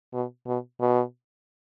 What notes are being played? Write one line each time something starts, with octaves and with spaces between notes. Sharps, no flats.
B2
B2
B2